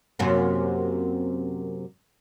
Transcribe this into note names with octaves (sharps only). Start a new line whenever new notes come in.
F#2 C3 A#3